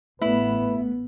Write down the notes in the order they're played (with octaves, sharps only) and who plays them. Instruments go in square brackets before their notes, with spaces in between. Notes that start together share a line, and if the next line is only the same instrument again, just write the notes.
[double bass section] A1 B3 [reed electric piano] A3 [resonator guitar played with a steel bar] E4 [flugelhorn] B4